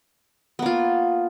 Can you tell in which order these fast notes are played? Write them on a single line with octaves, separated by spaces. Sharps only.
B3 A#3 F4